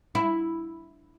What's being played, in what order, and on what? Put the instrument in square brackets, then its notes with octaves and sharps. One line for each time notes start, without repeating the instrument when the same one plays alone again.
[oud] E4